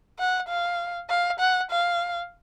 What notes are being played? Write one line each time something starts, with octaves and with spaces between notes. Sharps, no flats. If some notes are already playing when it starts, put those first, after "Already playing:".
F#5
F5
F5
F#5
F5